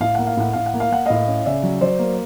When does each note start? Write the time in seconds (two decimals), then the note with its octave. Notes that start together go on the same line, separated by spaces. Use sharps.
0.01 A2 F5
0.15 A#3 F#5
0.27 F5
0.37 A2 F#5
0.53 A2 F5
0.66 F#5
0.74 A#3
0.80 F5
0.92 A#3 F#5
1.06 A2 D#5 F5
1.28 C#4
1.46 C#3 D5 E5
1.63 F#3
1.81 F#3 C5 D5
1.99 A#3